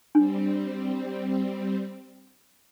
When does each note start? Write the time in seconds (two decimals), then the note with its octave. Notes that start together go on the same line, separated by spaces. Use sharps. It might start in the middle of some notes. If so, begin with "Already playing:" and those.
0.15 G3 C4 D4